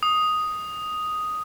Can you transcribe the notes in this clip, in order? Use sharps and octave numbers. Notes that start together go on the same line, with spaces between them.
D#6